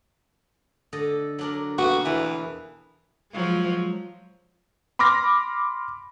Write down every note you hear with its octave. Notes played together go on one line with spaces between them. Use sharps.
D3 A4 D#5
F#3 D4 A#4
B2 A#3 B3 F#4
E2 E3 B4
F3 F#3 G#3
B5 C6 D6 F6 A#6